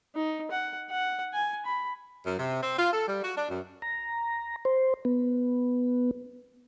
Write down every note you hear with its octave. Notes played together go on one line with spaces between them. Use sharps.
D#4
F#5
F#5
G#5
B5
F#2
C3
C4
F4
A4
G3
F#4
D4
F#2
A#5
C5
B3